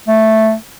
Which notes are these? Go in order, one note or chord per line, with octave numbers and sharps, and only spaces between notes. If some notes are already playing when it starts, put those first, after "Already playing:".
A3